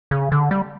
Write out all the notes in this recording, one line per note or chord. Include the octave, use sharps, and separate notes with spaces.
C#3
D3
G3